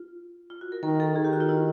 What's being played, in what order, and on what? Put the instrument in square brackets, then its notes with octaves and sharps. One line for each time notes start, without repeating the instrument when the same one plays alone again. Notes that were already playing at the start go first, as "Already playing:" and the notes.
Already playing: [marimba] F4
F4
F#4
A#4
[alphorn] D#3 [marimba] A#4
[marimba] A4
[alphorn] D#3 [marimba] G#4
[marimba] G4
F#4
F4
E4